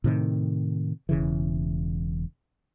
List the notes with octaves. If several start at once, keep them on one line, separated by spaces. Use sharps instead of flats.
A2 C3 D#3
E1 C#3 E3